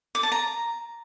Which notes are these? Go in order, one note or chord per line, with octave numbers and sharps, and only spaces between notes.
D6
A5
A#5